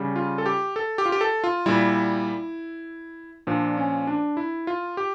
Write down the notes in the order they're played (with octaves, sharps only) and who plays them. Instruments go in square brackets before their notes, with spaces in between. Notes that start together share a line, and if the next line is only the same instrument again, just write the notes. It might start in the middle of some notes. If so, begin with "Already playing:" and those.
Already playing: [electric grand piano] C#3 G3
F4
A4
G4
A4
G4
F4
G4
A4
F4
A#2 G3 E4
A#2 F3 D4
C#4
D4
E4
F4
G4